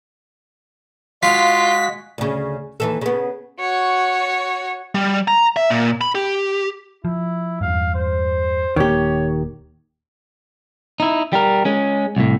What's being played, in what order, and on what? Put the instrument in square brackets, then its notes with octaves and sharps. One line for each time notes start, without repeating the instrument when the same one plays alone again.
[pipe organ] G#3 F#4 [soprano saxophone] F4 [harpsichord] F5 [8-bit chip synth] B6
[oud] D2 C#3
D#2 E3 A4
C#3 B3
[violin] F#4 C#5
[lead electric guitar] G3
A#5
E5
A#2
B5
G4
[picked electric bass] F3 [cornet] E4
[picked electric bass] E2 G2 [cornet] F5
[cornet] C5
[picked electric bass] D#1 A#3 [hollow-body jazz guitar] D#3 G4 [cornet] C#5
[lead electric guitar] D#4 E4
G3 A#4
G#3 C#4
C2 A2